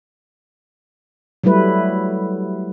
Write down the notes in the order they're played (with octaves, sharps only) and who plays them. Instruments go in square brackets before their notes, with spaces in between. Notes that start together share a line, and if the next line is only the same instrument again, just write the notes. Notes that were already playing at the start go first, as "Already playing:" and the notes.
[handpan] F#3 G3 A3 E4 B4